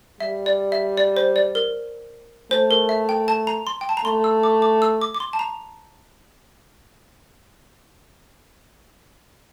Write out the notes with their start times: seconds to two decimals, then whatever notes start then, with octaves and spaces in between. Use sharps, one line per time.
0.20 G3 E5
0.46 D5
0.72 E5
0.97 D5
1.17 C5
1.36 D5
1.55 A#4
2.51 A3 C5
2.71 A#4
2.89 E5
3.09 G5
3.28 A5
3.47 A#5
3.67 C6
3.81 G5
3.89 A5
3.97 A#5
4.05 A3 C6
4.24 E6
4.43 D6
4.62 D6
4.82 E6
5.01 D6
5.15 D6
5.20 C6
5.33 A5
5.39 A#5